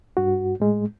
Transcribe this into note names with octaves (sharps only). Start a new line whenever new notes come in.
G2 F#4
A2 G#3